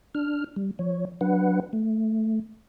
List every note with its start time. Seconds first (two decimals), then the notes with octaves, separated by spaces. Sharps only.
0.15 D4 F6
0.56 G3
0.79 F3 C#5
1.21 F#3 D4 B4 F#5
1.73 A3